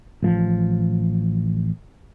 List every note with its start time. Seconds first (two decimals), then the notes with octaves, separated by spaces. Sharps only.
0.23 A1 F3